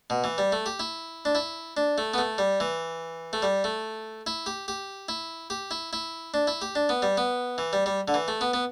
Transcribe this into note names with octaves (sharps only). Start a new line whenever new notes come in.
B2
E3
G3
A3
G4
E4
D4
E4
D4
A3
B3
A3
G3
E3
A3
G3
A3
E4
G4
G4
E4
G4
E4
E4
D4
E4
G4
D4
B3
G3
B3
E3
G3
G3
D3
E3
A3
B3
B3